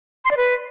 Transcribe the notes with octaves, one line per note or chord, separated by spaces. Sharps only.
C6
D5
B4